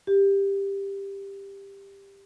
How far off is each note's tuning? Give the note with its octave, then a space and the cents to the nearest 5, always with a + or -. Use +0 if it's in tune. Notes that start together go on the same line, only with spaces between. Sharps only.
G4 +10